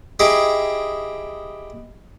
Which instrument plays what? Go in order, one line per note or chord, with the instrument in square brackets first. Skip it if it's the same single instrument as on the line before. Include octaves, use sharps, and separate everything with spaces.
[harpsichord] D#4 E4 G4 G#4 G5